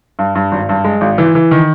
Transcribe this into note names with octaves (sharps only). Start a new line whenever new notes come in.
G2
G2
G#1
G2
G#3
G#1
E3
E3
D#3